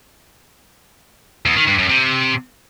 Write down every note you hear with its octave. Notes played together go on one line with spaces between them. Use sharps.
E2
D#3
G2
F#2
C3